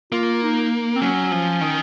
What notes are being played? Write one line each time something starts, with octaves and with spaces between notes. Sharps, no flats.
A#3 F4
D#4
C4
F#3 C#4
F3
D#3